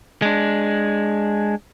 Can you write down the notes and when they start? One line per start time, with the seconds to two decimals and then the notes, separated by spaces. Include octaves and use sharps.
0.22 G#3 D4